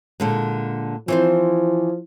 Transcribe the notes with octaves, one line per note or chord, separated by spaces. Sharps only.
A#2 D3 G#3
E3 F3 C4 C5